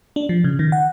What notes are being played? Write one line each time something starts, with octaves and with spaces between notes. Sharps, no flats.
D4
F3
C#3
D#3
F#5